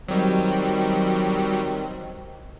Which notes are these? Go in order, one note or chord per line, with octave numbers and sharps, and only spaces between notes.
D#3 F#3 G3 C4